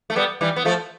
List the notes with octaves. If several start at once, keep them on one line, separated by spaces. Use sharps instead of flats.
A3
G3 B3
E3 G3
B3
F3 A3